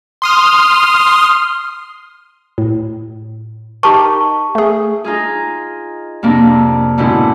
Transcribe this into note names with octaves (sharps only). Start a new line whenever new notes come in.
C6 D#6 F6
A2
D#4 G4 A#4 A5 C#6
A3 G#4
D#4 F4 G#4
F2 C3 A#3 D4
G#2 B2 D3 C#4 E4